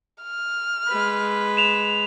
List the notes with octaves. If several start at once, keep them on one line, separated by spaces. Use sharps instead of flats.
F6
G#3 B4
E7 F7